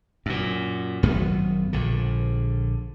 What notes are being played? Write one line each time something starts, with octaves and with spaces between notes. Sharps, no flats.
F#2 A#2
G#1 F#2 B3
A#1 D3